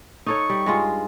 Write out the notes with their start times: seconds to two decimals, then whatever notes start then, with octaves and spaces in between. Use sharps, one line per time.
0.26 D#4 A4 C#5 C#6
0.50 G3
0.66 G2 G#3 F4